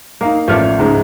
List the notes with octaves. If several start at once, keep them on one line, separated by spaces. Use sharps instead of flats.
A#3 D#4 F5 A#5
A1 F3 A3 D5 F6
C#2 G#2 G#3